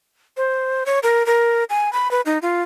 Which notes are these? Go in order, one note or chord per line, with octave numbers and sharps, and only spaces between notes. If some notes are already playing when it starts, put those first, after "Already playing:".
C5
C#5
A#4
A#4
G#5
B5
B4
D#4
F4